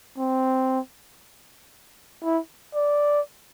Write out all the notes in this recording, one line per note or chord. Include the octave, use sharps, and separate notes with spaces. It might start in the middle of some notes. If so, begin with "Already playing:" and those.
C4
E4
D5